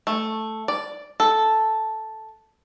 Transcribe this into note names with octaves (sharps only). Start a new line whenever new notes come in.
A3
D5
A4